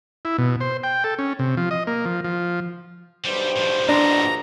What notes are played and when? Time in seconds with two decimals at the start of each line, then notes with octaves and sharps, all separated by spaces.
0.25 E4
0.38 B2
0.61 C5
0.83 G5
1.04 A4
1.19 C#4
1.39 C3
1.57 F3
1.71 D#5
1.87 A#3
2.05 F3
2.24 F3
3.25 B1 G2 G3 G4 C5
3.56 A2 F3
3.88 A#1 B2 D4 A#5 C6